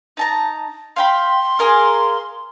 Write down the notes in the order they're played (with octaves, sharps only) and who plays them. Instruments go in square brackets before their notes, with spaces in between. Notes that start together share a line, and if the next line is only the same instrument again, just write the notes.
[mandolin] D#4 A5 A#5
[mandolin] F5 G5 B5 [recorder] C6
[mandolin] G#4 A#4 F5